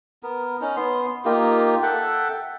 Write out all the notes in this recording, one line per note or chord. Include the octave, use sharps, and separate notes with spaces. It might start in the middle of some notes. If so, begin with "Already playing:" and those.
B3 A#4
C#4 D#4
B3 C6
A#3 D#4 F4 G4
A4 E5 F#5 G5